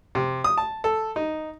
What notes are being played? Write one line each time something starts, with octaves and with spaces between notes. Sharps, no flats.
C3
D#6
A5
A4
D#4